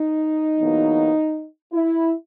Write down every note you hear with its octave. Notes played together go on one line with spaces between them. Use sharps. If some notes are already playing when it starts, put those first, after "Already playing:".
Already playing: D#4
E2 B2 F#3 A#3
E4